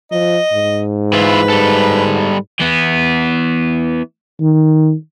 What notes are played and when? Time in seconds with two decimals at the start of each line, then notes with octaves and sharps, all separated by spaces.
0.12 F3 D#5
0.53 G#2
1.13 E3 E4 F4 B4
1.49 G3 A4
2.60 E3 B3
4.40 D#3